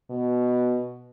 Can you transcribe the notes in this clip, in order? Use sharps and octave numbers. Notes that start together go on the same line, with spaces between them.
B2